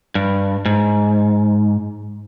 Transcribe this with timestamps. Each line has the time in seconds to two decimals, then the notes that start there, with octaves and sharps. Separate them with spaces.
0.15 G2
0.66 G#2